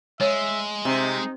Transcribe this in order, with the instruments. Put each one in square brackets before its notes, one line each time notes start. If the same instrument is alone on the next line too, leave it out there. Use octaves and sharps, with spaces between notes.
[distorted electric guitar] G#3 [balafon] C#5 [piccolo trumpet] E5
[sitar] C3 [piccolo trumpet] D#4